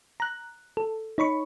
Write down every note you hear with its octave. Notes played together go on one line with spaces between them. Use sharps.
A#5 F#6
A4
D#4 C#5 B5 C#6